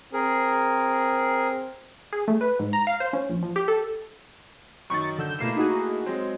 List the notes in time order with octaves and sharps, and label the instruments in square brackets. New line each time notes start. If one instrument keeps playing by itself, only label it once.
[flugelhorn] C4 [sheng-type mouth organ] G#4 A#4
[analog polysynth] G#4
A3
B4
G#2
A#5
F5
C5
C#4
A#1
F3
G4
A4
[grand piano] F#2 D#3 [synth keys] C#6 A6
[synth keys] D3 E6 G6
[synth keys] B2 C7 E7 [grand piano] A3 A#3 E4
[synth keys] D#4 F#4 G#4
[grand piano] F#3 G#3 C4